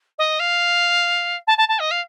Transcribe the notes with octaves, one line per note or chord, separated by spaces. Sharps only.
D#5
F5
A5
A5
A5
D#5
F5